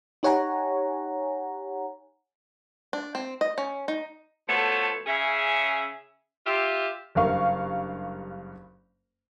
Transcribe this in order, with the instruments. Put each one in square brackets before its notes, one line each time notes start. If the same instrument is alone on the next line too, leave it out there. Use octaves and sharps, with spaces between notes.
[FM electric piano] D#4 G4 C#5 F#5 G#5 A#5
[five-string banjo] D4
C4
D#5
C#4
D#4
[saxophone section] F3 A3 B3 F#4 A4 C#5
C#3 C#4 G#4 E5
F4 G4 E5
[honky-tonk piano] F#1 G2 A#4 F5 C#6